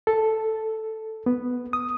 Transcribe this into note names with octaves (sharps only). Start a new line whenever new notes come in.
A4
B3
D#6